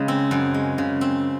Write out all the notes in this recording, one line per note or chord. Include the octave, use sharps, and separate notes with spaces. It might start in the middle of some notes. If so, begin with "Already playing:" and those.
Already playing: C#3 G#3
C4
F#2
G#3
C#3
C4